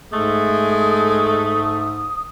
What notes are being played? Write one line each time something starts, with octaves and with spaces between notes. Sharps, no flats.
G#2 G#3 A3 D#6